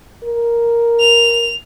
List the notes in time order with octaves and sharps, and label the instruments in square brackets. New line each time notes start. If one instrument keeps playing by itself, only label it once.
[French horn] A#4
[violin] F7